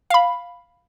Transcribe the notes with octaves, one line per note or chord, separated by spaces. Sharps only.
F5 B5